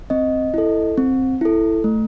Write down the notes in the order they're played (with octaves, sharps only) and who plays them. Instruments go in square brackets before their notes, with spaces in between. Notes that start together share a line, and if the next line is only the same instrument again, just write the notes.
[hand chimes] C4 D#5
E4 A4
C4
E4 A4
A3